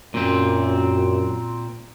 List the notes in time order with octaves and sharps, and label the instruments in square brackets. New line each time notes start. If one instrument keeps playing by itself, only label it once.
[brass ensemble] F#2 [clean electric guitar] A#2 C4